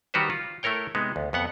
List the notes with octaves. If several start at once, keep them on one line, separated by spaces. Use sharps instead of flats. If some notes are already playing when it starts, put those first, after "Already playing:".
D#3 G3 F#4 G4 B4 C5
F4
A3 E4 A#4 C#5 G5
C3 G#3 B3 D#4
D2
F2 B3 F#5